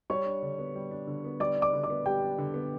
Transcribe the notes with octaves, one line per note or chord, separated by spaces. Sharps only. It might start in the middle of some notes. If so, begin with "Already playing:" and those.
G3 C#5 C#6
D4
D3
B3
G3
D4
D3
B3
G3 D5 D6
D4
D5 D6
D3
D5 D6
B3
G3 G4 G5
D4
D3
B3